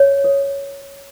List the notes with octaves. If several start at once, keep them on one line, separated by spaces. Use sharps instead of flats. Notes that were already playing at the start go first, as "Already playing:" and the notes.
Already playing: C#5
A4